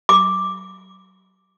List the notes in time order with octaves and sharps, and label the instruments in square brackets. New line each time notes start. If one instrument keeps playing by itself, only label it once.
[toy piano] D6